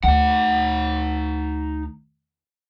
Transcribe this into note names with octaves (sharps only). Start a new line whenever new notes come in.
D2 D#4 F#5